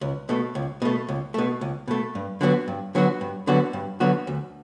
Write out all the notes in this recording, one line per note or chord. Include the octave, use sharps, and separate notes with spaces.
C#2
B2 A3
C#2
B2 A3
C#2
B2 A3
C#2
B2 A3
G2
D3 F#3 B3 F#4
G2
D3 F#3 B3 F#4
G2
D3 F#3 B3 F#4
G2
D3 F#3 B3 F#4
D2